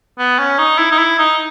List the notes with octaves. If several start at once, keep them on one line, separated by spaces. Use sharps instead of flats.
B3
C#4
D#4
E4
D#4
E4
D#4